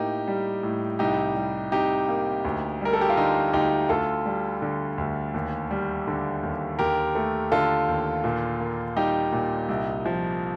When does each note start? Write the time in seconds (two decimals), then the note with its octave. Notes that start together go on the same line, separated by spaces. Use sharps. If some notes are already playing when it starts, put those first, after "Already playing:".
Already playing: A2 A#3 D#4 G4
0.28 G3
0.63 A2
0.99 C2 D#4 G4
1.35 G3
1.72 C3 D#4 G4
2.09 A#3
2.45 D2
2.81 G3 A#4
2.93 A4
3.01 G4
3.10 F4
3.17 D3 D#4
3.53 D2 D#4 G4
3.89 D2 F4 A4
4.26 G3
4.62 D3
4.98 D2
5.34 D#2
5.71 G3
6.07 D3
6.43 D#2
6.79 D#2 G4 A#4
7.15 A3
7.52 D3 F4 A4
7.88 D#2
8.24 A#2
8.60 A#3
8.96 G3 D#4 G4
9.32 A#2
9.69 C2
10.06 F3